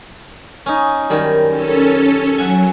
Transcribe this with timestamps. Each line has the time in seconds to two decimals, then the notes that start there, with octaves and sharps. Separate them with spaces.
0.66 C#4 D#4
1.10 F#2 D#3 G3
1.49 C#4 A4
2.38 F#3 E5 F#5 G#5